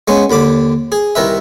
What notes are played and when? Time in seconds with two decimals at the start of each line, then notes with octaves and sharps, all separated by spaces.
0.08 G#3 B3 C#4
0.30 D#2 D3 B5 D6
0.92 G#4
1.15 C2 D#3 A#4 B4 E5